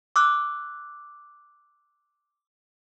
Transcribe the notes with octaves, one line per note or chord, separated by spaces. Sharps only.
D6 E6 F#6